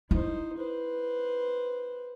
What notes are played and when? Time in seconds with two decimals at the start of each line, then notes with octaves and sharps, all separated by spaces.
0.11 D#4 E4 C5
0.57 B4 C5